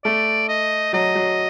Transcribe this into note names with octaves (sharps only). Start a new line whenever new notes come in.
A3 D5
D#5
F#3 D#5
F#3